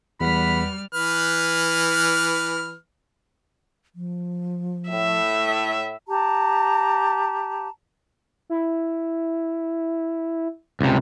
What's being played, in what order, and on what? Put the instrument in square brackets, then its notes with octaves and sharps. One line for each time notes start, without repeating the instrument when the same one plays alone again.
[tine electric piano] E2 B6 [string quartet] G3 F6 [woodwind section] B4 F#5 B5
[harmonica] E3 B4 F6
[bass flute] F3
[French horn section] A2 [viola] E5
[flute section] G4 A5 A#5
[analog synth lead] E4
[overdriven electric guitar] C#2 C3